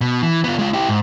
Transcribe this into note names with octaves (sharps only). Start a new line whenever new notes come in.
B2
E3
B3 F4
G#3 F4
E4 G4
G#2